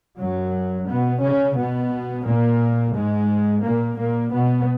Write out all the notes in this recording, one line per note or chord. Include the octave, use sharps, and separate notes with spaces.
F#2 F#3
B2 B3
C#3 C#4
B2 B3
A#2 A#3
G#2 G#3
A#2 A#3
A#2 A#3
B2 B3